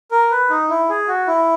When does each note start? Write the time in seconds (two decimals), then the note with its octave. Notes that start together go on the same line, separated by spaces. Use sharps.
0.11 A#4
0.31 B4
0.50 D#4
0.69 E4
0.89 G#4
1.08 F#4
1.27 E4